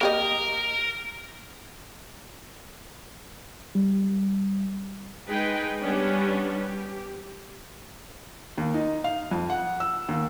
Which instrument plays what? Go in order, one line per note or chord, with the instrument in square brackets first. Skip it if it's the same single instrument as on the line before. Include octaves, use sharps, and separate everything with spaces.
[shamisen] A#3 G4 D#5 [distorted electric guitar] A#4
[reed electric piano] G3
[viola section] G#3 D#4 G#4 B4 G5
G3 B3 C#4 D4
G4
[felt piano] D#2
D#4
F5
F2
F#5
E6
D#2